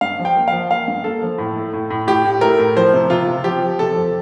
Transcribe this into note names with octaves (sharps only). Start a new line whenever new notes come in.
G2 F5
F3
G5
A#3
F5
F3
A#3 F5
G2
A#3 A4
F3
A2
A3
A2
A2
A2 G4
A2
A3 A#4
A2
F3 C5
C3
C3 F4
C3
F3 G4
F3
C3 A4
F2